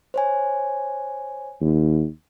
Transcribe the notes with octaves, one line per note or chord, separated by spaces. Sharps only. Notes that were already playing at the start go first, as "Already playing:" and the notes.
C5 C#5 G#5
D#2